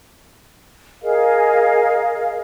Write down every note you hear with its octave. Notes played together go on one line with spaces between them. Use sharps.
G#4 A#4 D#5 F5